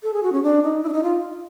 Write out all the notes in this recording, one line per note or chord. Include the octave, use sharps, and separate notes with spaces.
A4
G#4
F#4
C#4
D4
D#4
E4
D4
D#4
F4